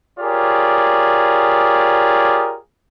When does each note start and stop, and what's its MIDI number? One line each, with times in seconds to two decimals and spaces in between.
0.20 2.56 65
0.20 2.56 67
0.20 2.56 68
0.20 2.56 70
0.20 2.56 73
0.20 2.56 74